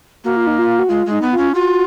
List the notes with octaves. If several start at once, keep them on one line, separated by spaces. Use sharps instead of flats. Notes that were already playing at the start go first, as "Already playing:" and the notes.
A#3 F#4
F4
D#4
F4
F#4
G#3 F4
G#3 D#4
B3
F4
C#4
F4 F#4